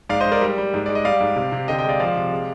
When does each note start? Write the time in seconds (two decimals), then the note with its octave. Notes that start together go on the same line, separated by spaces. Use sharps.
0.09 G#2 D5 F5
0.20 C5 D#5
0.25 G#2
0.32 A#4 D5
0.41 G3
0.58 G3
0.74 G#2
0.86 G#3 D5
0.95 D#5
1.05 G3 D5 F5
1.21 G#2
1.36 C3
1.52 C3
1.68 D3 D#5 G5
1.78 D#5 G5
1.85 G#3 D5 F5
2.00 F3 D5 F5
2.16 C3
2.32 G#3